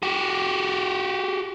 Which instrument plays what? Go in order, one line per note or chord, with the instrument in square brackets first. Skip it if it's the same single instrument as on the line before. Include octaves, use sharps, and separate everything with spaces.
[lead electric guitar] F#4 G4